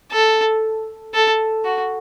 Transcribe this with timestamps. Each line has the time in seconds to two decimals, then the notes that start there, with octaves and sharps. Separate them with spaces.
0.12 A4
1.14 A4
1.64 F#4